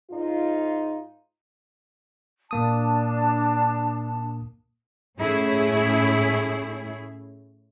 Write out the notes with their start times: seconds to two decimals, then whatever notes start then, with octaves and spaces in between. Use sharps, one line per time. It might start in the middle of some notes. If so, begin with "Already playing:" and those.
0.11 G#2 D#4 F4
2.51 A#2 A#3 D4 A5 D#6
5.18 A2 A3 C#4 E4 G#4